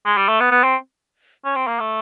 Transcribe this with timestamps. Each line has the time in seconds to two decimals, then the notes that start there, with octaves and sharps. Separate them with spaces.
0.06 G#3
0.17 G3
0.28 A3
0.40 B3
0.51 B3
0.64 C4
1.45 C#4
1.55 C4
1.67 A#3
1.80 A3